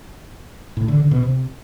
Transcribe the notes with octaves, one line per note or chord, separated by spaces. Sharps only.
A2
D3
D3
B2
C3